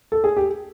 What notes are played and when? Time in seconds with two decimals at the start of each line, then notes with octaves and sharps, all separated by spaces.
0.12 A4
0.24 G#4
0.37 G4